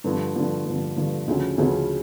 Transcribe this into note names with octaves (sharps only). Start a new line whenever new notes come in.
G2 D3 F3
G2 D3 F3
G2 D3 F3
G2 D3 F3
D2 C#3 F3 C#4
D2 C#3 F3 C#4